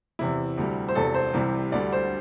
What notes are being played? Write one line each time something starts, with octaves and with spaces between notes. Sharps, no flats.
E2 C3 E3 E4
D2 C3 G3
C5
E1 E2 C3 A4
C5
C2 C3 E3 G3
D2 D3 G3 D5
C5